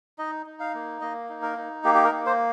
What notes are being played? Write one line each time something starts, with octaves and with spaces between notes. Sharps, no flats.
D#4 D#5
D#4
F5
A#3
A#3 D#5
D#4
A#4
D#4
A#3 G4
G4
A#4
A#3
C5